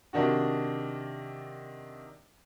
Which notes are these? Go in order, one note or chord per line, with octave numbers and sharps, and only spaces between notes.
C3 D#3 D4 F#4